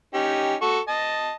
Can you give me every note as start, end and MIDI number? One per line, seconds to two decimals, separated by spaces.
0.14 0.55 61
0.14 0.55 63
0.14 0.55 67
0.62 0.79 66
0.62 0.79 69
0.62 0.79 85
0.88 1.32 75
0.88 1.32 81